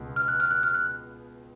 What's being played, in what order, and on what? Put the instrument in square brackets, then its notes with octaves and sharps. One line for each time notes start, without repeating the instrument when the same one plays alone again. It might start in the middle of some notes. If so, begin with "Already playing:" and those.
Already playing: [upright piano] C#2 B2 B3
[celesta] F6
F#6
F6
F#6
F6
F#6